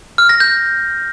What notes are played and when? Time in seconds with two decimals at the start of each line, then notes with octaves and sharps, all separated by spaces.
0.18 F6
0.29 A#6
0.40 G6